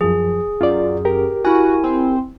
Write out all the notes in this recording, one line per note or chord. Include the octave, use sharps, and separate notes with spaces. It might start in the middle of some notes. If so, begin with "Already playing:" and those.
F#2 F3 G#4
F#2 F4 D5
G4 A#4
E4 F#4 G#5
C4